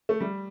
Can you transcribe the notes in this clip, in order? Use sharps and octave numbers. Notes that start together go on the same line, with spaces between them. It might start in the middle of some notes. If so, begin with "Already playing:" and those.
A3
G3